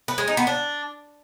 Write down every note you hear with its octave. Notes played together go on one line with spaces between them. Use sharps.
B4
G#3
D#4
B3
D4